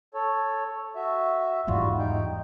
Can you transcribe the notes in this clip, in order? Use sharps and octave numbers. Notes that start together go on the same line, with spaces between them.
A4 C#5
F#4 E5
E2 G#2 G3 F4 F#4
D#4 G5